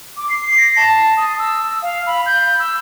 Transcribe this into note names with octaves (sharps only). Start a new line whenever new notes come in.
D6
C7
A#6
A5
D#6
E6
F5
B5
G6
E6